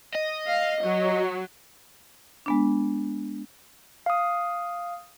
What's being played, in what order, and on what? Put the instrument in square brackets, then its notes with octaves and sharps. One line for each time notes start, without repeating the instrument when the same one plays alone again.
[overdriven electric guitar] D#5
[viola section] F5
F#3
[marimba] G#3 B3 D4
[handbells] F5 D#6